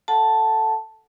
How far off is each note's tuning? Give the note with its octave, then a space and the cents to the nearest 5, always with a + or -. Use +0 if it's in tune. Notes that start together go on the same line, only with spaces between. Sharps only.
A4 +0 F#5 +0 A5 +0